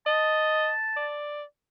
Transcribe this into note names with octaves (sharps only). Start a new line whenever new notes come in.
D#5 A5
D5